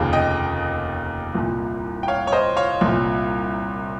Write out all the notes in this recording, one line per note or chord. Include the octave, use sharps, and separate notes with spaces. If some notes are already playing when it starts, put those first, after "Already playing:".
Already playing: F1 D#2 C#3
D#5 G5
C2 A#2
G5
C#5 F5
C#5
C5 D#5
C#5 F5
C2 A#2